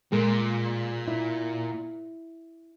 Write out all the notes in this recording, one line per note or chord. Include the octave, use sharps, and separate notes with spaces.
A#2 G#3 A4 A#4
E4